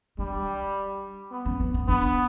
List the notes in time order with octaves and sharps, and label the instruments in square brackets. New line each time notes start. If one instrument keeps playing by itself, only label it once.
[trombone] G3 [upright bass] D4
[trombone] B3
[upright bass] C#4
C#4
C#4
[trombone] B3 [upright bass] D4